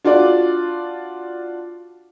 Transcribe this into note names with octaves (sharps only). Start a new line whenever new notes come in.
D4 F4 F#4 D5